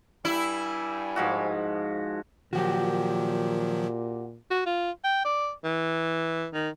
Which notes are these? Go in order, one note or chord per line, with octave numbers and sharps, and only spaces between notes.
G2 G3 E4 G#5
G#2 F3 F#4
A#2 D#3 F3 F#3 F#4 G4
F#4
F4
G5
D5
E3
D#3